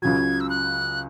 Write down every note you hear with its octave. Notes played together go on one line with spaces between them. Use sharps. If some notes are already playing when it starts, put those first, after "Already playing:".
C#2 C#3 F#3 G#6
E6
F#6